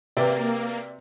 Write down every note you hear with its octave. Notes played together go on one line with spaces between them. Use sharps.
C3 A#3 F#4 B4 D5 E5 G5 D6